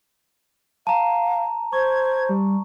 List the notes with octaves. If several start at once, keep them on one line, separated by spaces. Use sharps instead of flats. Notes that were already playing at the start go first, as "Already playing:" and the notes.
F5 A5 A#5
C5 C#6 G#6
G3